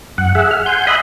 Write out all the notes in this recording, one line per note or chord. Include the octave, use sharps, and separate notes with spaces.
F#2 F#5
G#4 E5 F#5
F6
F#5 G#5 C6 G6
D#5 E5 B5 C6 D#6 F#6